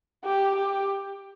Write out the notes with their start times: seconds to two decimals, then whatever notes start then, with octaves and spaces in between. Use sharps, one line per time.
0.24 G4
0.56 G4